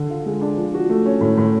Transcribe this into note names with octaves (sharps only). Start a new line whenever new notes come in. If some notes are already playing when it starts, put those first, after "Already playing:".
Already playing: D3
F4
G#3
D4
F3
F#4
A3
C#4
A2
A2